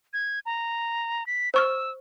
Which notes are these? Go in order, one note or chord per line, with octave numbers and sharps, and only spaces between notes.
G#6
A#5
B6
C5 C#6 E6 F6